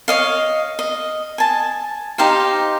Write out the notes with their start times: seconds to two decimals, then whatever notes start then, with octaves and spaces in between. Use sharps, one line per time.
0.08 C#5 D#5 F5
0.79 D#5
1.38 G#5 A5
2.18 D#4 G4 C5 F5